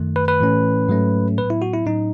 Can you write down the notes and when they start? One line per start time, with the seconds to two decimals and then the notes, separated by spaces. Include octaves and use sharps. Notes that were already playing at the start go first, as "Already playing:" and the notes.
Already playing: F#2 D#3 A3
0.16 B4
0.28 B4
0.40 A2 E3 A3 C#4
0.88 G#2 F#3 A3 C#4
1.38 A2 F#3 B3 B4
1.50 E4
1.62 F#4
1.74 E4
1.86 A2 F#3 A3 C#4 D#4